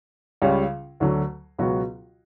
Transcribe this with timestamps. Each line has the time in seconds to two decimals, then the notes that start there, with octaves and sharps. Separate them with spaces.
0.42 C#2 C#3 G3 C#4
1.00 D2 D3 F#3
1.58 C#2 B2 F#3 B3 F#4